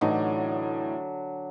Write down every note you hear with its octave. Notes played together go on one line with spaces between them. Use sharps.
A2 D3 E3 F#3 D#4